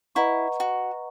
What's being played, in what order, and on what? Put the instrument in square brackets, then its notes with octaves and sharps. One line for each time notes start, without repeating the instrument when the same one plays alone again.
[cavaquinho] E4 [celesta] B4 D#5 F#5 A#5 C#6
[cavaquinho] F#4